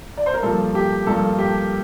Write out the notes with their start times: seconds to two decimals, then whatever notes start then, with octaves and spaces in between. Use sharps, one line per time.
0.17 D5
0.26 C5
0.34 A#4
0.43 G2 F3 A#3 A4
0.75 G4
1.06 G2 F3 A#3 A4
1.39 G4